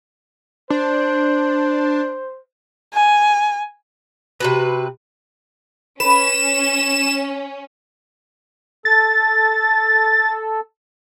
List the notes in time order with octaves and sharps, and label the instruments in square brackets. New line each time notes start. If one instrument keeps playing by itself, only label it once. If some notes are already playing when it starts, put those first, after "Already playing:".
[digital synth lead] D4 [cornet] C5
[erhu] G#5
[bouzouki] C3 F3 B4 [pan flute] F#4
[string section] C#4 [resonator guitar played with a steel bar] B4 [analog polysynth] E7
[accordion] A4 [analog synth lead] A6